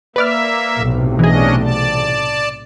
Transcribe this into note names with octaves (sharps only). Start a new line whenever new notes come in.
A#3 B4 D5 E5 F6
B1 A2 C3
E3 C#4 D4 G#4 D#5
D5 A5